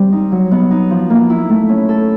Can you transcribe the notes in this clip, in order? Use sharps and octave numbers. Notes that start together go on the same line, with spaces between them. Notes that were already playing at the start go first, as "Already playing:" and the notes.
Already playing: G3 C4
D#4
F#3
B3
D#4
F3
A#3
E4
A3
C#4
A4